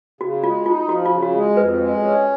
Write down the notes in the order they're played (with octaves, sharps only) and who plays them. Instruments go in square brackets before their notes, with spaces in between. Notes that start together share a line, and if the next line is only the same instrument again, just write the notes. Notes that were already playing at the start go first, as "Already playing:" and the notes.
[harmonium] C#3 [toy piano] F#4
[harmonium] G#3 [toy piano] F4
[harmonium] D#4 [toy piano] F4
[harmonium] F3 [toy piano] F#4
[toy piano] F4
[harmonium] C#3
[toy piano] F#4
[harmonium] G#3
[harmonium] F2 [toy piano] B4
[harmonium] G#3
C#4